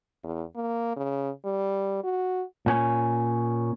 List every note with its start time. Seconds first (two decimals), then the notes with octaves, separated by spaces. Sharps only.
0.24 E2
0.56 A#3
0.97 C#3
1.45 G3
2.04 F#4
2.66 A#2 C#4